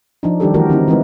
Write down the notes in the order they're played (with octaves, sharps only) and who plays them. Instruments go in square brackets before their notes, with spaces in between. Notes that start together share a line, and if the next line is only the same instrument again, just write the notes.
[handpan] F3 D4 D#4
D#3 G3 D4 G4 A4
D#3 E3 A3 F#4 G4 A#4
D3 C4 D#4 E4
E3 G#3 C4 D#4 B4